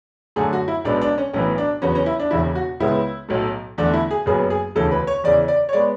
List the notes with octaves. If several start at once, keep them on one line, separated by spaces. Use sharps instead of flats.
F#2 D3 A3 G#4
F#4
E4
B1 B2 G#3 B3 D4
D4
C#4
B1 A2 E3 B3 C#4
D4
E2 C#3 F#3 B3 C#4
C#4
E4
D4
E1 E2 C#3 E4
F#4
C#2 C#3 G#3 B3 E4
B1 A2 F#3 A3
E2 D3 A3 D4
E4
G#4
F#1 F#2 C#3 F#3 B3 G#4
G#4
E1 D2 C#3 E3 A4
B4
C#5
E2 C#3 E3 D5
D5
C#5
G#3 B3 D5